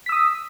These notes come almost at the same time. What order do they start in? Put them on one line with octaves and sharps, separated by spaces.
B6 E6 D#6